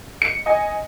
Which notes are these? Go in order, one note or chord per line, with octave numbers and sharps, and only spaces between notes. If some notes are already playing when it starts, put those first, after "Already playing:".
C#7
D#5 G#5